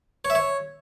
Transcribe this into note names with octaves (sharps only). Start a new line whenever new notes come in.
C#5
E5
C#5